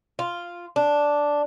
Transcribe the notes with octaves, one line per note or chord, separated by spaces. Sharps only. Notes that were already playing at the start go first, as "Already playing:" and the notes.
F4
D4